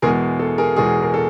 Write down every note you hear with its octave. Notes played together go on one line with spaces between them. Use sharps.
E2 B2 G#3 G#4 A#4
A4
G#4 A#4
E2 B2 G#3 G#4
A#4
A4